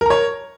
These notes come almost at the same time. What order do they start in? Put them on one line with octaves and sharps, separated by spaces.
A#4 A#5 C#5